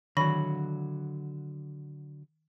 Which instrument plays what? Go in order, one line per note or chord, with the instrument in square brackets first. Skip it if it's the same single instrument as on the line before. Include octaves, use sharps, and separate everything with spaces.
[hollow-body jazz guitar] D3 F#3 [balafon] D#3 [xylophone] B5 A#6